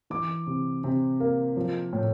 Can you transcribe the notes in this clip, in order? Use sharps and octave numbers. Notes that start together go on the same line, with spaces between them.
E3 D6
C3
C3
A#3
F3
A2